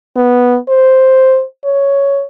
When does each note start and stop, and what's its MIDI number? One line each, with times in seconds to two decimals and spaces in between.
0.16 0.58 59
0.69 1.44 72
1.65 2.25 73